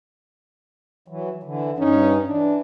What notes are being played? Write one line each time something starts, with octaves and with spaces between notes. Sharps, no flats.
E3 F#3
D3 E3
G2 C#4 D#4
E3 D4